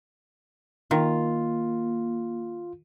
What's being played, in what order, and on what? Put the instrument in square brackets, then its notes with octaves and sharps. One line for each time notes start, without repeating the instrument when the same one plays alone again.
[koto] D#3 [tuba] A#3 [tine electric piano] F4